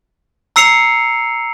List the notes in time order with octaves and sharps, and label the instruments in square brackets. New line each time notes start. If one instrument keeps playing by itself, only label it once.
[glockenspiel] A#5 E6 C7 C#7 F7